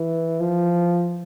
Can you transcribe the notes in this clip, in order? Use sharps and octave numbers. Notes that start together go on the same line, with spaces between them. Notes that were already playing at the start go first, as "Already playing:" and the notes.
Already playing: E3
F3